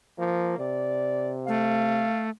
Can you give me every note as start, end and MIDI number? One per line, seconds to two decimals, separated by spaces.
0.19 0.58 53
0.19 0.54 58
0.59 2.12 48
0.59 1.34 74
1.48 2.30 57
1.48 2.28 77